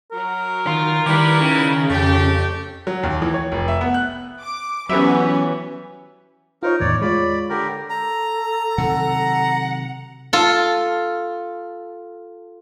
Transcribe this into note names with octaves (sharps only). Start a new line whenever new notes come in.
F#3 A#4
D#3 F4
D#3 G3 E4 G4 B4
C#3
F2 A3 G4
F#3
D#2
E3
C#5
F1
E5
B3
F#6
D6
E3 F#3 B3 C#4 G4 B4 E5
D#4 F4 A#4 C5 C#5
E2 A2 D#3 C#5 D5
G#3 F4 C#5 D5 B5
D3 G4 A#4
A4 A#5
C3 D#3 F#3 F#5
F4 A4